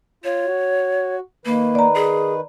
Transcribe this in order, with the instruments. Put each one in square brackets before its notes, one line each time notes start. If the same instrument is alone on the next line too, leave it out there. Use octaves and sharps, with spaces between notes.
[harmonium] F4 [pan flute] C#5
[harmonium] F#4
[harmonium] D#3 B4 [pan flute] A#3
[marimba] D5 A#5
[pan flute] G#4